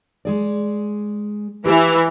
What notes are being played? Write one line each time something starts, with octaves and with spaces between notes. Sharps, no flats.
G#3 G#4 D5
E3 G4 F5